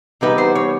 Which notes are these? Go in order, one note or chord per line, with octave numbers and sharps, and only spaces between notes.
C3 E3 G3 B3 D#4 B4
C5
C#5